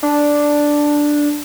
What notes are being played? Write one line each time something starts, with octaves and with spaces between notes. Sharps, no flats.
D4